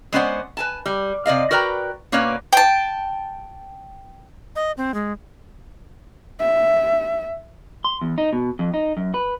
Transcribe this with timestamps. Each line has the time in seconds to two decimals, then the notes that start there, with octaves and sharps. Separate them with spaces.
0.12 G#3 B3 C#4 C5 D5 F#5
0.57 B4 G#5 A5
0.86 G3
1.26 C3 D5 D#5 F5
1.51 F#4 A#4 B4 D5 G5 A#5
2.12 B2 A#3 C#4 B4 C#5 D5
2.53 G5 A5
4.56 D#5
4.77 C4
4.94 G#3
6.39 E5
7.85 C6
8.01 E2
8.18 D#4
8.33 B2
8.59 F2
8.74 D#4
8.97 F#2
9.14 B4